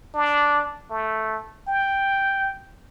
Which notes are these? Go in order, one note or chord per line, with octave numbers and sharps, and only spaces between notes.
D4
A3
G5